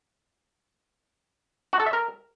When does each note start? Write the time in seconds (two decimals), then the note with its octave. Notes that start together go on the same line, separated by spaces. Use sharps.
1.73 F#4
1.80 A4
1.86 E5
1.93 A#4